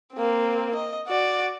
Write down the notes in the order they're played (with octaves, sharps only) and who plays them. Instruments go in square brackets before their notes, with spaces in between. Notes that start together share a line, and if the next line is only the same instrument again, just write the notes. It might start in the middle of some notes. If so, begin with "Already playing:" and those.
[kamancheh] A#3 C4
D#5
F#4 D5